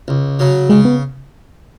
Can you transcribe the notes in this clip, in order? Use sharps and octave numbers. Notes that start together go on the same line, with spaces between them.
C#2
C#3 F#3
C#3 G#3
B3